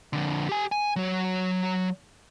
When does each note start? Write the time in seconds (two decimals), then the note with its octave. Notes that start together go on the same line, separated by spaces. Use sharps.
0.13 F2 D3
0.49 G4 G#5
0.72 G#5
0.96 F#3 C#5